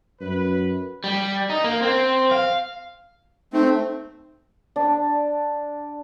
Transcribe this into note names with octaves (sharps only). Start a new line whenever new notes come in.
F#2 B4
G3
D#4
A#3
C4
F5
A3 C4 D#4
D4